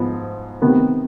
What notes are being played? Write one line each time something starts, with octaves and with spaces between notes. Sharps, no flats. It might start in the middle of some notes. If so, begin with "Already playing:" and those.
Already playing: G#2 F3 B3
C3 D#3 B3